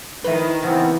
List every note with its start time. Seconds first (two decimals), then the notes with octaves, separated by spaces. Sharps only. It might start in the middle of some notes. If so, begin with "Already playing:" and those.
0.24 D#3 E4 B4
0.63 C#3 E3 B3 C4